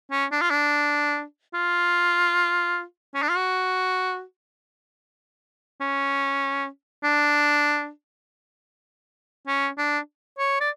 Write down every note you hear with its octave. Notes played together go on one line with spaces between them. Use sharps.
C#4
D4
F4
D4
F4
C#4
D4
F4
F#4
C#4
D4
C#4
D4
C#5
D5